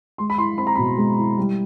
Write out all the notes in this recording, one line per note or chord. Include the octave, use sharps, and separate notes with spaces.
G#3 C6
B5
E4 C6
C4 B5
A#5
B2 B5
G#3
E4
G3